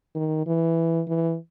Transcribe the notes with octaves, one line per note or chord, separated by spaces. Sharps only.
D#3
E3
E3